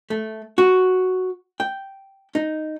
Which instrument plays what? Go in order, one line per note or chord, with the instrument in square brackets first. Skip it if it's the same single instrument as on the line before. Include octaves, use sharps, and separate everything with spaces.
[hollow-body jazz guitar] A3
F#4
G5
D#4